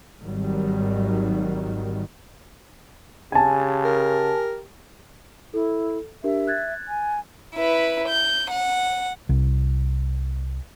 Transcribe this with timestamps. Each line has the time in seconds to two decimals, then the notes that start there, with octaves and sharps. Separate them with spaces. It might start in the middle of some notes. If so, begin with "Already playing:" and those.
0.23 G#1 D#3 F#3 G3
3.32 C#3 G4 G#5 A5
3.85 A#4
5.54 E4 A4
6.24 D4 G4 A#4 E5
6.47 F#6 G#6 A6
6.88 G#5
7.55 E4 B4
8.08 G6
8.50 F#5
9.29 C2